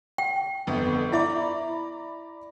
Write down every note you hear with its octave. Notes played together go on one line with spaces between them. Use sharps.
G5
G1 F2 B3
E4 D5 E5 A#5 B5 D6